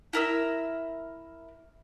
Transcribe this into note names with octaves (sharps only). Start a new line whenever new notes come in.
E4 A#4 E5 E6